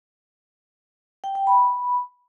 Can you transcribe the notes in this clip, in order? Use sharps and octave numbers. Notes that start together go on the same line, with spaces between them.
G5
G5
B5